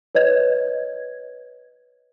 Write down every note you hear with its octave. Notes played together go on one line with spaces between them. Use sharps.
B4 C#5 D#5 G#6